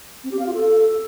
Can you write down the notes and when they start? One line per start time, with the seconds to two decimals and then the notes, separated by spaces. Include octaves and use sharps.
0.24 C4
0.31 G4
0.39 F5
0.47 F4
0.54 A4